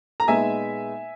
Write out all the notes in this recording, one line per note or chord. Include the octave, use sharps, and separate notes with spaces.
A#5
A#2 G#3 B3 D#4 E5 G#5